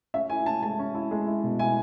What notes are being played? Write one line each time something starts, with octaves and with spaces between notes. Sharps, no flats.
C#4 E5
E4 G#5
C#4 A5
G#3 A5
C#4
E4
G#3
E4
B2
E4 G#5